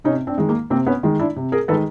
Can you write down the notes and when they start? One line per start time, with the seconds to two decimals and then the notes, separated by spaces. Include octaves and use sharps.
0.04 C3 C#4 D#4
0.27 C4 D4
0.38 D#3 G#3
0.49 A#3
0.70 C3 A#3 C4
0.86 B3 C#4
1.03 D#3 G#3
1.19 D4 E4
1.36 C3
1.52 G#4 A#4
1.68 D#3 A4 B4
1.71 G#3